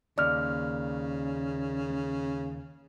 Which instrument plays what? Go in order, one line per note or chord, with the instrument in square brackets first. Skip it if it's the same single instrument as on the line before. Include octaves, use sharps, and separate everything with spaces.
[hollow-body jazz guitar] D#2 [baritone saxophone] C#3 [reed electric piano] D5 F6